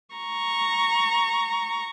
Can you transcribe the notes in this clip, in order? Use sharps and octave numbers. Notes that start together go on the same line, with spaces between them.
A#5 C#6